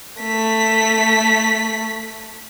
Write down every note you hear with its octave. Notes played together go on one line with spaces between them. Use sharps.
A3 B6